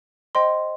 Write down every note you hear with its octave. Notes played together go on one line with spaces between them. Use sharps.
C5 D#5 G5 C6